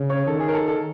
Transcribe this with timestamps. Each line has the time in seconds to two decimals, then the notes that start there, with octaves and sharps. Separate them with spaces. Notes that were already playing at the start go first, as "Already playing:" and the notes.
Already playing: C#3
0.10 C#5
0.27 D#3 A4
0.40 G#4
0.48 A#4
0.54 A4
0.68 A4